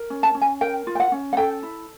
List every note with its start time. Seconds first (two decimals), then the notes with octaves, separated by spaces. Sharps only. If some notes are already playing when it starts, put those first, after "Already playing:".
Already playing: A#4
0.10 C#4
0.23 A5
0.35 C#4
0.41 G#5
0.61 A#4 G5
0.87 F4
0.95 G5
1.00 F#5
1.12 C#4
1.33 F#5
1.37 A4 G5
1.63 E4